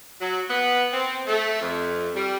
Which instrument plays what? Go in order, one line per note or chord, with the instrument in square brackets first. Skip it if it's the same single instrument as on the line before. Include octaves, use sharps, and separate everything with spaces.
[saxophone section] F#3
B3
C4
A3
F2
G3